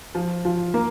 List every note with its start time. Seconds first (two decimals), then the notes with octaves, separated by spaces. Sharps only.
0.15 F3 F4
0.45 F3 F4
0.74 A#3 A#4